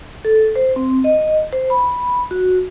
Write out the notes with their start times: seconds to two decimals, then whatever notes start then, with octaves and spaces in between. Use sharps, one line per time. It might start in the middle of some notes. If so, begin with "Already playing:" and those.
0.25 A4
0.56 C5
0.76 C4
1.04 D#5
1.53 C5
1.70 B5
2.31 F#4